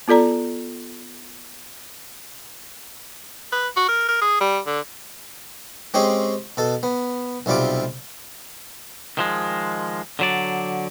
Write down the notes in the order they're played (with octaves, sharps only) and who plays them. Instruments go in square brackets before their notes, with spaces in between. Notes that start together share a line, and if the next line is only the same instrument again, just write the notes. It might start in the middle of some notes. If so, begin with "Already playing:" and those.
[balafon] B3 F4 A4 D5 A#5
[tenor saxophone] B4
F#4
A#4
A#4
G#4
G3
D3
[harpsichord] G#3 C4 C#4 G4 G#4
B2 A4
B3
B1 C3 G3 F4 D6
[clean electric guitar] D#3 F3 G#3
D3 F#3 D5